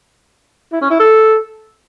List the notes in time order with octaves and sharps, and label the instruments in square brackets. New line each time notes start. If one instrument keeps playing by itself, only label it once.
[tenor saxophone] E4
C#4
E4
A4